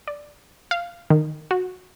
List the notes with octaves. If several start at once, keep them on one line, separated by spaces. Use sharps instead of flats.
D5
F5
D#3
F#4